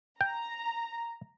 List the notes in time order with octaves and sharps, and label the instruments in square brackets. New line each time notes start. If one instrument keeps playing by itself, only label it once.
[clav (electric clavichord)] G5 [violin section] A#5